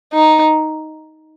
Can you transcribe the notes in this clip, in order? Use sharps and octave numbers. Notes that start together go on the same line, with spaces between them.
D#4